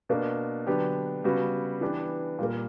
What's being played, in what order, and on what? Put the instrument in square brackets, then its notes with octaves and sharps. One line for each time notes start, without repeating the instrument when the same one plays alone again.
[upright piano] B2 A#3 D4
D3 F#3 B3 D4 G4
C#3 G3 B3 F#4
E3 B3 D4 G4
A#2 G3 A#3